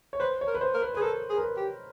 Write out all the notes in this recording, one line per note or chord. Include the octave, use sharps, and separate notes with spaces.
C#5
B4 C5
C#5
A#4
B4
C5
A#4
B4
G#4 B4
A4 A#4
G#4
A#4
B4
G4